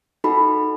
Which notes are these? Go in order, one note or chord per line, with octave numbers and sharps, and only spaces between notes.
D#4 F#4 A4 B5